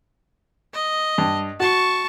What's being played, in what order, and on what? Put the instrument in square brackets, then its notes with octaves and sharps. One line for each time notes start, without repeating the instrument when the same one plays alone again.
[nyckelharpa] D#5
[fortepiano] G2
[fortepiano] F#4 [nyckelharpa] A5 C#6